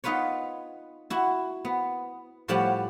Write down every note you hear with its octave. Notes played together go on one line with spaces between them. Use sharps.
B3 D#4 F4 B4 C#5
E4 F#4
B3
A2 F3 G3 G4 C#5 F#5